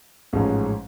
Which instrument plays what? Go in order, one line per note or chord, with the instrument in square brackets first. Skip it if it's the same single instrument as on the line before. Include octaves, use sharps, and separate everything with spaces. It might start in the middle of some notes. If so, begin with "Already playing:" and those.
[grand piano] A1 G#2 F3 G#3 C#4